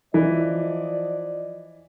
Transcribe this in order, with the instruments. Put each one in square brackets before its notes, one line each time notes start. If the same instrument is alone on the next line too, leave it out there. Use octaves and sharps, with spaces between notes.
[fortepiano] E3 [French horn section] F3 D5 D#5